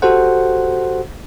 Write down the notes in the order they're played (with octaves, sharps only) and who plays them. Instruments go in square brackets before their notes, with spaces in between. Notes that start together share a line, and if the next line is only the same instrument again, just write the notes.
[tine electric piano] F#4 G4 A4 C5 F#5